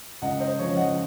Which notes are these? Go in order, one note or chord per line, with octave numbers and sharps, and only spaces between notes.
C#2 D#5 F#5
C5 D#5
C#3 F3 C#5
D#5 F#5